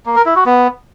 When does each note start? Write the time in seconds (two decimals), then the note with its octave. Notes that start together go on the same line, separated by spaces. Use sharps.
0.06 A#3
0.16 A#4
0.26 E4
0.36 F#4
0.46 B3